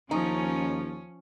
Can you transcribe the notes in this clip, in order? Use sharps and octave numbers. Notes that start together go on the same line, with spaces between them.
D#2 F3 C#4 D#4